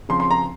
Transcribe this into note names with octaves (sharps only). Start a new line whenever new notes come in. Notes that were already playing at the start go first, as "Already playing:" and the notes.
C#3 F3 C4 C6
C6
A#5